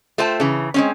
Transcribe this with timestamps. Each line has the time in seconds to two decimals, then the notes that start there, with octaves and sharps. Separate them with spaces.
0.18 A3 F4 C5 G5 A5
0.40 C#3 E3
0.74 G#3 C4 C#4